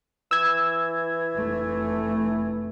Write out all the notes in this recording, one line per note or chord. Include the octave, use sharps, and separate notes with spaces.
E3 E6 G#6
F1 A3